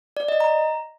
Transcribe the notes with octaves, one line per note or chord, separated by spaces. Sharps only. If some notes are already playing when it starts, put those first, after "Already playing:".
D5
D#5
A#5